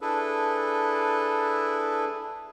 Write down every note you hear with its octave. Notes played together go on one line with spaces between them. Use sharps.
D4 E4 G#4 A4 B4